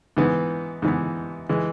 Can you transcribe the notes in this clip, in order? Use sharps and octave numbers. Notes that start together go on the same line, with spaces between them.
G#2 E3 B3
G#2 E3 B3
E3 G#3